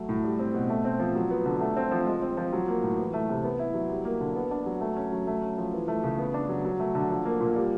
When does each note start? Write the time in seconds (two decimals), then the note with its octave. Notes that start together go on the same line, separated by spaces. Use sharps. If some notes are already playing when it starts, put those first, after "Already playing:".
Already playing: F#3 A3
0.09 A2
0.24 G3
0.39 C4
0.54 B2
0.69 A3
0.85 C4
0.99 F3
1.15 F#3
1.30 B3
1.46 D3
1.61 A3
1.77 C4
1.91 F3
2.07 G#3
2.22 C4
2.37 F3
2.53 F#3
2.68 A#3
2.83 A2
2.98 E3
3.14 A3
3.29 C3
3.44 B3
3.59 E4
3.74 F#3
3.89 G3
4.05 A#3
4.21 D3
4.36 B3
4.51 D4
4.66 F#3
4.81 A3
4.97 C#4
5.12 F#3
5.27 A3
5.42 C#4
5.58 F3
5.73 E3
5.88 A3
6.04 C#3
6.19 B3
6.34 D4
6.49 F#3
6.65 F#3
6.80 A3
6.95 D3
7.10 F3
7.25 A#3
7.40 A#2
7.56 G3